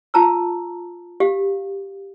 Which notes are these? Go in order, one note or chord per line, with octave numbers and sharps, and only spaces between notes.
F4 A5 A#5 E6
G4 F5